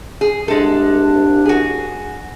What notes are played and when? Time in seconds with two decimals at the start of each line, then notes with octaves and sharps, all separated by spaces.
0.21 G#4
0.48 C2 G#3 D4 A4
1.46 F#4 G#4